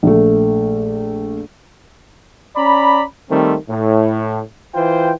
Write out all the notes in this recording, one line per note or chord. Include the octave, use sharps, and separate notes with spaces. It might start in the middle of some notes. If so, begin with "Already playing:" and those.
A#1 A3
C#4 D5 A#5 B5
D#3 G3 A3 C4
A2
E3 F4 C5 G5